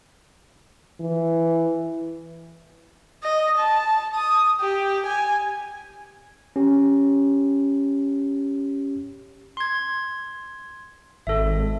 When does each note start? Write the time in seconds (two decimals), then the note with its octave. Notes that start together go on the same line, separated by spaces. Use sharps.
1.00 E3
3.24 D#5
3.58 A5
4.15 D#6
4.61 G4
5.06 G#5
6.56 C#4 G4
9.57 C6 G#6
11.27 G#1 A4 E5